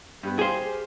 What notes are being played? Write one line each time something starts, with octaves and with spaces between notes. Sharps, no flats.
G2 G3 B3
G4 G#4 C5 F5 C6